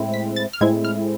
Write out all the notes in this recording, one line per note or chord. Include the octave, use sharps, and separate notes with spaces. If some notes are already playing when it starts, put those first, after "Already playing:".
Already playing: A2 G#3 C4 E4
B6
A6
F6
A2 G#3 C4 E4 G#6
F6